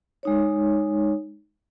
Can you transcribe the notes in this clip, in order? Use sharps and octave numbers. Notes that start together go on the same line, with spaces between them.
G#3 D#4 C#5